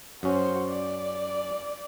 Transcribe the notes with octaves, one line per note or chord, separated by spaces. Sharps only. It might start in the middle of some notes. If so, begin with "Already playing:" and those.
F#2 C#4 F#4 C5
D5